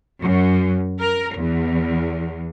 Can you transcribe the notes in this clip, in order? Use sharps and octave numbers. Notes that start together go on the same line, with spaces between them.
F#2
A#4
E2